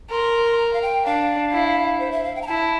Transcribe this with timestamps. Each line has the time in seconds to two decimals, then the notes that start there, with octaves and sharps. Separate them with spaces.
0.10 A#4 C6
0.58 A#5
0.73 F5
0.82 G5
1.05 D4 F5
1.53 E4
2.00 C5
2.11 E5
2.23 F5
2.35 G5
2.42 A#5
2.47 E4 A5